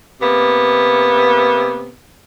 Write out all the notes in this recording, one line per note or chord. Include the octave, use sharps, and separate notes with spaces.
C3 A#3 B3